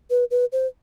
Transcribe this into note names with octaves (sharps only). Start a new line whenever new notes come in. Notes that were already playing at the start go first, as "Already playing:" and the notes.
B4
B4
C5